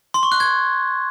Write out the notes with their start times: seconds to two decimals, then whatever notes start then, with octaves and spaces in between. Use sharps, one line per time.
0.14 C6
0.23 C#6
0.32 F#6
0.40 G#6